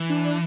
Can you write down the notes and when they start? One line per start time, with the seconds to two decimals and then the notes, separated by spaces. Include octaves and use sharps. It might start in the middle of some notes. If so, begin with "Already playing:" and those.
Already playing: E3
0.10 D4